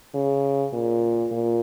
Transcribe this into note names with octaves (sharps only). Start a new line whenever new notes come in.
C#3
A#2
A#2